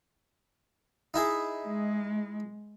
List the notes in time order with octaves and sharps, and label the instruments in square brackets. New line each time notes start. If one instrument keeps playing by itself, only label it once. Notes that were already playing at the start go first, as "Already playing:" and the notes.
[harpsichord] D#4 E4 G#4
[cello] G#3